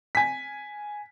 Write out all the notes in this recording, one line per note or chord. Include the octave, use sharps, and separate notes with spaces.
G#5 B6